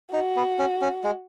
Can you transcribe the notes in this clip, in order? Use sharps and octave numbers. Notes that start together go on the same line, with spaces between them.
D#4 F#4
B3
C#4
C#4
G#3